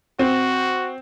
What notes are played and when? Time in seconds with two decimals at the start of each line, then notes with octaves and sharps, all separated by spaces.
0.19 C4 F#4